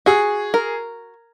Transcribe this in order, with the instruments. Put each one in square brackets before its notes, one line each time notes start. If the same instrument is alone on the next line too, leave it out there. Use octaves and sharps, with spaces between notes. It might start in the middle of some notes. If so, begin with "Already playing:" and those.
[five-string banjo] F#4 [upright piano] G#4
[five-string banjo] A#4